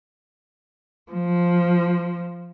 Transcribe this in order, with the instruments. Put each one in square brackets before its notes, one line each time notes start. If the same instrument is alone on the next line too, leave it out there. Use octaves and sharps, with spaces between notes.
[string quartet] F3